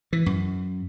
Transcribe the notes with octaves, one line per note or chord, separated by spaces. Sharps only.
E3
F#2